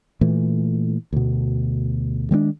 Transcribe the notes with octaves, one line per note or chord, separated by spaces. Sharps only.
A#2 E3 A3
D2 B2
D#3 G#3 A3 D4